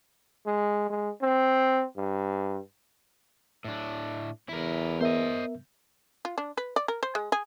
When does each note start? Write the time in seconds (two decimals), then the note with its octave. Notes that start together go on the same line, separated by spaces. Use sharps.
0.46 G#3
0.90 G#3
1.22 C4
1.97 G2
3.64 A2 D4
4.49 E2 E4 A#4
5.01 B3 A#4 C5 D#5 E5
6.25 F4
6.38 D4
6.57 B4
6.76 D5
6.88 A#4
7.03 C5
7.15 G#3
7.32 G#4